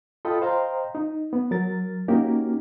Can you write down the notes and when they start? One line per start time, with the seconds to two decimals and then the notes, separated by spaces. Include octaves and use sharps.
0.25 F4 A4 D#5 G5 B5 D#6
0.42 C5 D#5 F5 G5 A#5 C6
0.95 D#4
1.33 B3
1.51 F#3 A#4 A6
2.08 A#3 C#4 D#4 F#4 G4 A#4